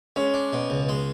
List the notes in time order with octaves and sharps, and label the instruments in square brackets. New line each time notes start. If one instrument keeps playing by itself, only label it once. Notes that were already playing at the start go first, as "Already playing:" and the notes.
[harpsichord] G#3 [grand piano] C#4
[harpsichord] D4
B2
C#2
G#3